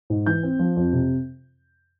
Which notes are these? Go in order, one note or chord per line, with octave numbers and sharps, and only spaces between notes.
G#2
E3 G6
C4
F3
F2
C3